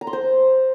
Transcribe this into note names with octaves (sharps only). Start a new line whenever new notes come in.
A#5
C6
C5